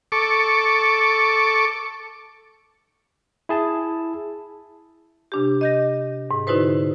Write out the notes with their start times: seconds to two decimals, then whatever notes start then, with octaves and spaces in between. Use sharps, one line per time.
0.12 A4 C#6 D6
3.49 E4 G#4 A5
5.32 C3 D4 G4
5.61 D#5 G6 A#6
6.31 G#2
6.47 D3 D#4 E4 F#4 B4 C5